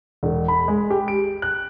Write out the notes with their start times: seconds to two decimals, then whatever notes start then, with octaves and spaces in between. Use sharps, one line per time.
0.23 E1
0.48 B5
0.68 G#3
0.91 G4
1.08 D7
1.42 F#6